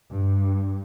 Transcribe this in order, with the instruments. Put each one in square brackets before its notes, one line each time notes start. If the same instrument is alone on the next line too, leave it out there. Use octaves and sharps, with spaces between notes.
[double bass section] G2